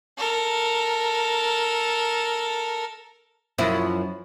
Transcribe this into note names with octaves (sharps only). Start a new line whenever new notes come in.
A4 A#4
F#2 F3 E4